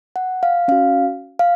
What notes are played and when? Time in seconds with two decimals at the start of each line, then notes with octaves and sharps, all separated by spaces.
0.16 F#5
0.43 F5
0.68 C#4 F#4 F5
1.39 F5